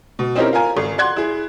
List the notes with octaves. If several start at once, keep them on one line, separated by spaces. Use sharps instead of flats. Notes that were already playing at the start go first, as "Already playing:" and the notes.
B2
C4 C#4 D#4 E4 G4 A#4
F4 A#4 F5 G#5 A#5
G#1
D5 F#5 C6 F#6 G#6
E4 G#4